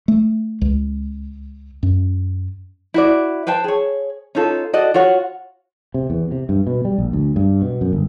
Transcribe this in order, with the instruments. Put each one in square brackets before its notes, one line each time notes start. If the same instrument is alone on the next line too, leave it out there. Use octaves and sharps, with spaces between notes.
[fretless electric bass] A3
C#2
F#2
[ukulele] E4 F#4 D5
B4 C5 G5 A5
G#4 C#5
C#4 D#4 F4 A4
F#4 A4 D5 D#5
F4 F#4 C#5 F#5
[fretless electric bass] C3
E2
C3
G2
B2
G3
A#1
D2
G2
B2
F#2
G1